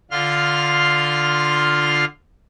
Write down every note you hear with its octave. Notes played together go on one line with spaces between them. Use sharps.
D3 F4 C6 F6